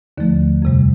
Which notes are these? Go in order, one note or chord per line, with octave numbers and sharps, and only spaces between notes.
D#2 D3 F3 A3
F2 C3 G3